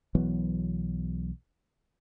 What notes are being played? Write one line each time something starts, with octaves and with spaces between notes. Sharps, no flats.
B1 E3 F#3 B3